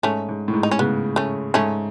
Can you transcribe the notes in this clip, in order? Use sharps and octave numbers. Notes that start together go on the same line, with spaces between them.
G#2 A3 C#4
G#2
A2
G#2
D#4
C#4
C#3 B3
A3 C#4
G#2 A3 C#4